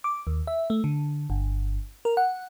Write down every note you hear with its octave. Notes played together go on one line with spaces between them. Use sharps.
D6
D#2
E5
A3
D3
G1
A#4
F#5